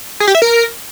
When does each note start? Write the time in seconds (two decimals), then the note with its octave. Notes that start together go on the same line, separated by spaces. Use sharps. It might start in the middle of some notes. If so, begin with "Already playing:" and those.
0.20 G#4
0.28 G4
0.35 E5
0.42 A#4